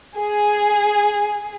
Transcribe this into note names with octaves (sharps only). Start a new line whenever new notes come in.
G#4